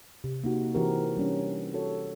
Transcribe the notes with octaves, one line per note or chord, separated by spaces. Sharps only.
C3
A#3 D#4 F#4
E3 C4 F#4 G4 A#4
G3 C#4 D4
F#4 A4 C#5